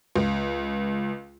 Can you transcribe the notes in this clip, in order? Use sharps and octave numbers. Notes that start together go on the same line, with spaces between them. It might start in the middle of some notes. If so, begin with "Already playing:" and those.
C#2